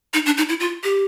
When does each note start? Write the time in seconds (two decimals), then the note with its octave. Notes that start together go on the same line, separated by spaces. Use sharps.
0.14 D#4
0.26 D4
0.38 D#4
0.49 E4
0.60 F4
0.84 G4